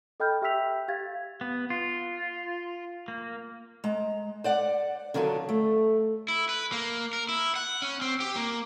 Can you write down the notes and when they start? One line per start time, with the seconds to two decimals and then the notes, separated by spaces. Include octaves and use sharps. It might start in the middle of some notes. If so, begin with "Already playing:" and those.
0.20 A4 D#5 G5 B5 F6 G6
0.42 G4 E5 G5 E6 B6 F7
0.88 G4 F5 G#6 A6
1.41 B3
1.70 F4
3.08 A#3
3.84 G#3 A#5
4.44 C5 D5 F#5
5.14 D3 D#3 F#3 D4 F4
5.49 A3
6.28 E4
6.49 B4
6.72 A#3
7.13 A#4
7.29 E4
7.56 F#5
7.82 C#4
8.01 C4
8.20 G4
8.36 A#3